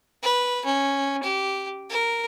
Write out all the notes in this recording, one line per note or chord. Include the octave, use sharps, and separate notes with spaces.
B4
C#4
G4
A#4